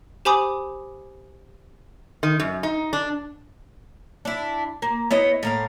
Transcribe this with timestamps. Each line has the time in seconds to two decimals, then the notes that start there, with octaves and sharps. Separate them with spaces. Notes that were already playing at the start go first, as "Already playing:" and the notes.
0.25 G4 C5 G#5 B5 D6 D#6
2.23 D#3
2.40 F#2
2.63 D#4
2.93 D4
4.25 D4 E4
4.82 A#3
5.11 B3 E4 C#5 D#5
5.43 A2 A#3 F5